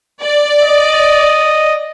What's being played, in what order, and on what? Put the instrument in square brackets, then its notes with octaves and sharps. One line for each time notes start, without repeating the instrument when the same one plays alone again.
[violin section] D5
[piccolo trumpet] D#5